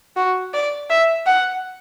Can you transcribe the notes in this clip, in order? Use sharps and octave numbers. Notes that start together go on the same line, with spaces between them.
F#4
D5
E5
F#5